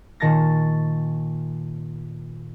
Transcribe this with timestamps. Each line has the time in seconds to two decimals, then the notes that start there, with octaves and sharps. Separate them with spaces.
0.20 A#2 D#3 A5 C#6 A6 A#6